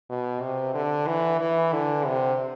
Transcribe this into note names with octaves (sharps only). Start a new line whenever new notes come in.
B2
C3
D3
E3
E3
D3
C3